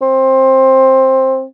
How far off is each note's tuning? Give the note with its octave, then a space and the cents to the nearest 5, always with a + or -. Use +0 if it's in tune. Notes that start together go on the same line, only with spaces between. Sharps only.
C4 +15